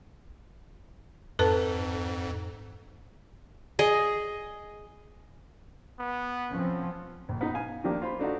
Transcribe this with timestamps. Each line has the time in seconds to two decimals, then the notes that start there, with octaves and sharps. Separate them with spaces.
1.39 F2 G#2 A4 B4 A5
3.79 G#4 D#5
5.99 B3
6.52 F3 C4 C#4
7.29 A#1
7.41 B3 D#4
7.54 F5 G#5
7.84 D#3 F3 A#3 D4 G4
8.02 F4 C5 B5
8.19 A3 D4 D#4 F#4